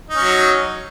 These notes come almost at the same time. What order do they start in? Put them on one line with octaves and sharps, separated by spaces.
D#4 C#4 F#3